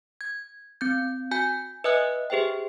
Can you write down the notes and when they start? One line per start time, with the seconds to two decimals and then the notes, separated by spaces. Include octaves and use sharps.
0.21 G#6
0.81 C4 G6
1.31 F#4 G#5 G6
1.84 B4 D#5 E5 G#5 D#6 F#6
2.30 G4 G#4 C5 E5 G5